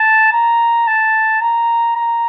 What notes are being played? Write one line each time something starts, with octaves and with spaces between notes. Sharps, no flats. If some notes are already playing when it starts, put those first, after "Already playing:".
Already playing: A5
A#5
A5
A#5
A#5